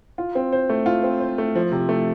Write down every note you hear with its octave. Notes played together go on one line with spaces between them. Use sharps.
F4
C4
C5
A3
F4
C4
C5
A3
F3
C3
A3